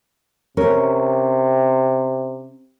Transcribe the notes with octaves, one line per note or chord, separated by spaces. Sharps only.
C3 C#4 A#4